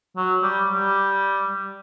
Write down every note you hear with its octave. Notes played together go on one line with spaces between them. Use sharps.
F#3
G3
G3